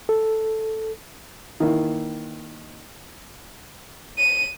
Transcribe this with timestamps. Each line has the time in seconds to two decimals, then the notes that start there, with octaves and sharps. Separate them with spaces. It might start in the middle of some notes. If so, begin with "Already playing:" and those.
0.09 A4
1.60 D#3 E3 A#3 E4
4.18 D#7